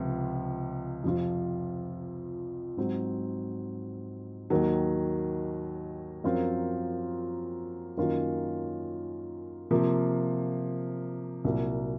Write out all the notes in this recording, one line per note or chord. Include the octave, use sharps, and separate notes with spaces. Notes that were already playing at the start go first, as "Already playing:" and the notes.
Already playing: C#2 C3 F3
F2 C3 F3 C4 F4
G#2 F#3 C4
D#2 D#3 F#3
F#2 F3 C4 F4 A#4
F#2 D#3 A#3 C#4 F4
C3 F3 A#3
C2 A#2 F#3 A#3